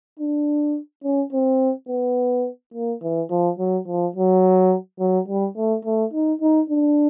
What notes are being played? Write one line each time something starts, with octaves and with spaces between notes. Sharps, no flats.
D4
C#4
C4
B3
A#3
E3
F3
F#3
F3
F#3
F#3
G3
A3
A3
D#4
D#4
D4